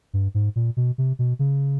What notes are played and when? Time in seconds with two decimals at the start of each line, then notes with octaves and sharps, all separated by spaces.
0.13 G2
0.34 G#2
0.56 A#2
0.77 B2
0.98 C3
1.19 B2
1.39 C#3